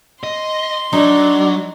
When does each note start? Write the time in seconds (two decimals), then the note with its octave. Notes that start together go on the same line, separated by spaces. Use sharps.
0.23 D#5 C6
0.93 F#3 D4 D#4